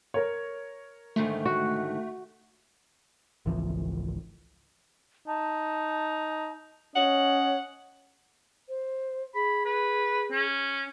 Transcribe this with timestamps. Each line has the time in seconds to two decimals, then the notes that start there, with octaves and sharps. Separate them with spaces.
0.14 A#4 C#5
1.16 G#2 D3 D#3 A3
1.46 F#4
3.46 G#1 C#2 E3 F3
5.27 D#4 A5
6.96 C#4 C#5 D#5 F#5
8.69 C5
9.35 G#4 B5
9.65 B4
10.31 C#4